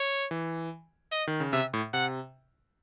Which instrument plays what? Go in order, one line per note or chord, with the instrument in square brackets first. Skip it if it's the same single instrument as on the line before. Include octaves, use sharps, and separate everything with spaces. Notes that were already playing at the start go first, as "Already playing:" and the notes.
Already playing: [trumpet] C#5
[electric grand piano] E3
[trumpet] D#5
[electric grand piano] D#3
C#3
[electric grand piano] C3 [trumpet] E5
[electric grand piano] A2
[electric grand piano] C3 [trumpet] F#5